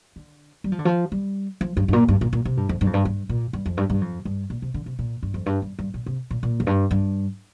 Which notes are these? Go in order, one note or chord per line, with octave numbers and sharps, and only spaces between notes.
D3
G3
F3
D3
F3
G3
F3
G2
G2
A#2
G2
A#2
A#2
C3
G2
F2
G2
F2
G2
G2
A#2
G2
F2
G2
G2
F2
G2
A#2
C3
D3
C3
A#2
G2
F2
G2
G2
G2
A#2
C3
A#2
A#2
F2
G2
G2